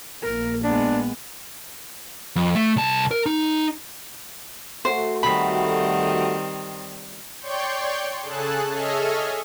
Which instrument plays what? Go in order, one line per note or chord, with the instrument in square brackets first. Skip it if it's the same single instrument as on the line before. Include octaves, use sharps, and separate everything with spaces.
[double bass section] A#1 A#3 [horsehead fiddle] A#4
[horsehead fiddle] G#3 B3 [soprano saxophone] D4
[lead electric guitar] F2
A3
C2 A5
A#4
D#4
[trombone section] A3 F#4 [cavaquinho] C5
[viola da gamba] D#3 G3 C4 [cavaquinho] B5
[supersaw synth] C#5 D5 G5 C6 C#6 G6
C#3 G#4 A4 A5 F#6
G#4 A4 C#5 D#5 E5 F6